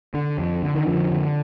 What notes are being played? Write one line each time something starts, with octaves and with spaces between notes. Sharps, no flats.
D3
F2
D3
D#3
F2 D3 F3
D3